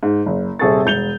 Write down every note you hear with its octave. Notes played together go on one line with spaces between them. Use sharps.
G#2
F#1
D#1 C3 G#4 A4 C#6 A6
E1 G6 F7 G7